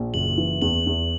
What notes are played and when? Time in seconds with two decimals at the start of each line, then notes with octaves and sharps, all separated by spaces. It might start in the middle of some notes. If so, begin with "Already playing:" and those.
Already playing: A#1
0.14 F#1 F#7
0.38 E3
0.62 E2 F#7
0.87 E2